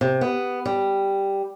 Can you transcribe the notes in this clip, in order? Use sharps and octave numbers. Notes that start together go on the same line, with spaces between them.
C3
B3
G3